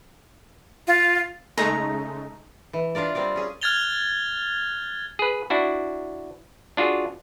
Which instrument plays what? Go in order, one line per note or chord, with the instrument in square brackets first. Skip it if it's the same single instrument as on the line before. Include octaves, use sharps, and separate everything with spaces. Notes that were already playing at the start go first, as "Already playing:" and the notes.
[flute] F4
[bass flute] C#3 [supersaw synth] G#3 A3 D#4 [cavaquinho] A#5
[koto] E3
D4 F4 A#4 D5
G3 C4 A#4 D5
C#4 G#4
[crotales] F6 F#6 G#6 A6 F7 G7
[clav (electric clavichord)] G#4 B4
D4 E4 F#4
D4 F4 F#4 G#4